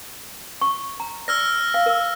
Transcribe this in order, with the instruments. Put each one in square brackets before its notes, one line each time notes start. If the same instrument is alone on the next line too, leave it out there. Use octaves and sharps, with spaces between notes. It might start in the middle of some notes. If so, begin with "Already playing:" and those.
[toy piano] C#6
A#5
[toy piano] D5 [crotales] E6 F6 A#6
[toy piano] F5
A#4